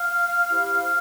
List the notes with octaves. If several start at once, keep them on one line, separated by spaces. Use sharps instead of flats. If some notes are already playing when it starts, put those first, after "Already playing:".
Already playing: F5 F6
E4 G4 C5